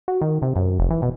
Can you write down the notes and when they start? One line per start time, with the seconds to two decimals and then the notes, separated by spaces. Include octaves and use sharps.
0.08 F#4
0.21 D#3
0.42 C3
0.56 F#2
0.79 F1
0.90 E3
1.02 B2